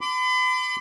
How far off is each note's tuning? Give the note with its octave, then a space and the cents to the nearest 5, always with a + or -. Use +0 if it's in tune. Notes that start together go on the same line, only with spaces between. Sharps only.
B5 +45 D6 +0